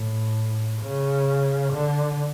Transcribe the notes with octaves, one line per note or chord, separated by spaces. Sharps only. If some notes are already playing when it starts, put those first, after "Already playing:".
Already playing: A2
C#3
D3